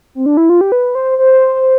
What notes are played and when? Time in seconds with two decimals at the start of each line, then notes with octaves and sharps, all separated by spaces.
0.15 C4
0.26 D4
0.37 E4
0.50 F4
0.61 G4
0.72 B4
0.95 C5
1.18 C5